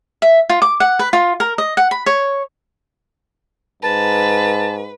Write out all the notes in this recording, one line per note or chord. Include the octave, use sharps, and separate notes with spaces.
E5
F4
D6
F#5
B4
F4
A#4
D#5
F#5
B5
C#5
G#2 B4 A5